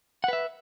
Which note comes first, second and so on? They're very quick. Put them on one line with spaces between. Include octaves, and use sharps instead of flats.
F#5 B4 E5